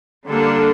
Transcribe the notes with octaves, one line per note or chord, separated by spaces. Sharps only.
D3 G3 A#3 D4 A4